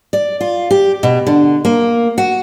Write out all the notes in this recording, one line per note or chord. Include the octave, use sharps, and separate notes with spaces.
D5
F4
G4
B2
D3
A#3
F#4